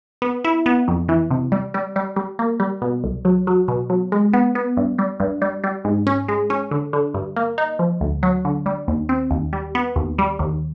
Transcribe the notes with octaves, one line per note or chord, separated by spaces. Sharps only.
B3
E4
B3
F2
E3
C3
G3
G3
G3
G3
A#3
G3
B2
C2
F#3
F#3
B2
F#3
G#3
B3
B3
G2
G3
G2
G3
G3
G#2
C#4
G#3
C#4
D3
D3
G2
A#3
D#4
F3
D2
F#3
D3
G3
D#2
C4
D#2
G3
B3
D#2
G3
D#2